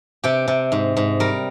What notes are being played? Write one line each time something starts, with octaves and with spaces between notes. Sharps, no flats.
C3 G4
C3
G#2
G#2
G3 A#4